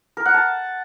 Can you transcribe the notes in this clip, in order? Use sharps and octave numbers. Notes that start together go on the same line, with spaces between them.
A#4
F#5
A5